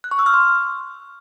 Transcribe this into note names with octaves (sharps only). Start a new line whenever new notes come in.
F#6
C#6
E6
F6
C6